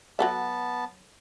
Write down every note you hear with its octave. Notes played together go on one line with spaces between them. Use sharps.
F#3 B3 A4 E5 A5